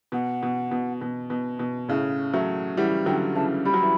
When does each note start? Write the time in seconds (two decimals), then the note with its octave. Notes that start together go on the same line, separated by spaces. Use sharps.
0.12 B2 F#5
0.43 B2
0.71 B2
1.01 B2
1.30 B2
1.59 B2
1.88 A2 C#3
2.34 F#3 A3
2.77 E3 G3 F#5
3.06 D3 F#3 G5
3.35 C#3 E3 A5
3.65 G3 B5
3.74 F#3
3.83 E3